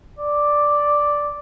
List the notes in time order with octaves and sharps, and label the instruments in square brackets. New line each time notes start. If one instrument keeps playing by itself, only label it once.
[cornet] D5